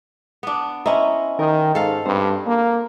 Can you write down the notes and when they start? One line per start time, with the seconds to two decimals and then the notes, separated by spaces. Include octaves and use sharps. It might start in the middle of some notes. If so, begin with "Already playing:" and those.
0.43 B3 D4
0.86 C#4 E4 C5 D#5 A#5
1.39 D#3 A#4 D#5 G5
1.75 G#2 A4 F5
2.05 G2 C4 C5
2.47 A#3